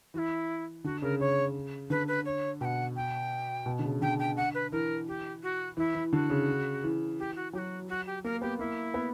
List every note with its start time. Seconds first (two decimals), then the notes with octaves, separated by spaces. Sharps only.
0.14 E3 F#4
0.18 E4
0.84 D3 F#4
1.02 C#3 A#4
1.19 C#3 C#5
1.90 D3 B4
2.08 B4
2.25 C#5
2.60 B2 F#5 G5
2.96 G5
3.66 B2
3.79 D3
3.84 C#3
4.01 D3 G5
4.19 G5
4.36 F#5
4.54 B4
4.72 E3 A#4
5.07 G4
5.42 F#4
5.77 E3 E4
5.95 E3
6.13 D3 F#4
6.30 C#3
6.84 E3
7.18 G4
7.36 F#4
7.53 F#3 G4
7.58 F#4
7.89 F#4
8.06 G4
8.24 A#3 A#4
8.41 B3 G4
8.59 A#3 E4
8.94 B3